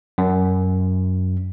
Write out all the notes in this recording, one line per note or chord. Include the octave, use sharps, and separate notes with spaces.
F#2